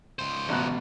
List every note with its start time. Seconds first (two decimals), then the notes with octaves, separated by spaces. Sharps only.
0.19 C#2 C5
0.49 A1 B2 F#6